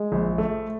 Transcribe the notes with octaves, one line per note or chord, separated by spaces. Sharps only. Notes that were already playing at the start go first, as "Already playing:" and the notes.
Already playing: G#3
A#1
A3